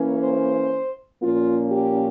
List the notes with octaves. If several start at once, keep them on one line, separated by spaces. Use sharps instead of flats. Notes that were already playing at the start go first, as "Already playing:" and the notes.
Already playing: E3 A#3 C#4
C5
A#2 F3 A#3 C#4 F4
G4